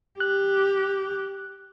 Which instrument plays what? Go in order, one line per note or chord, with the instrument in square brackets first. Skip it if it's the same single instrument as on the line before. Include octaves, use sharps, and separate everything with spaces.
[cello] G4 [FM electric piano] F#6